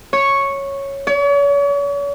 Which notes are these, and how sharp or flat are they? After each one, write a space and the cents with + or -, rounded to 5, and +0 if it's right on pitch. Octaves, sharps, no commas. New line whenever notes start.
C#5 -5
C#5 +40